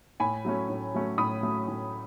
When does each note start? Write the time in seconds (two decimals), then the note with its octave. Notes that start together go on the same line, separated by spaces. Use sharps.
0.20 A2 G#5 B5
0.45 F#3 A3 C#4
0.69 A2
0.94 F#3 A3 C#4
1.18 A2 B5 D#6
1.43 F#3 A3 C#4
1.67 A2